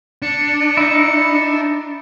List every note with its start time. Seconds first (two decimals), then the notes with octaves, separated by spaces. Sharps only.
0.22 D4 C#7
0.77 D#4 E4